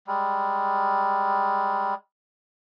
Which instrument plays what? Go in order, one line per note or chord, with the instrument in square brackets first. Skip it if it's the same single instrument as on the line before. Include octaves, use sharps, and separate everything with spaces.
[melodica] G3 G#3